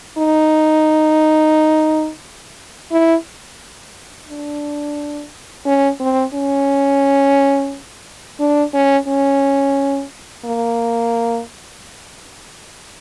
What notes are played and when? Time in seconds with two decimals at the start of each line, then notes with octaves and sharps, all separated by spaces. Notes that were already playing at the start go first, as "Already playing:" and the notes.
0.18 D#4
2.91 E4
4.28 D4
5.65 C#4
6.00 C4
6.34 C#4
8.39 D4
8.74 C#4
9.08 C#4
10.45 A#3